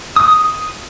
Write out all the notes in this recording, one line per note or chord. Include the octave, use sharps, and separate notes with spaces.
D#6